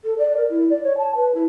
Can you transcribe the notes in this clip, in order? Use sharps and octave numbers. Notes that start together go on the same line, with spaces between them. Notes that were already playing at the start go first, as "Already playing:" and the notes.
A4
D5
A#4
E4
D5
C#5
A5
B4
E4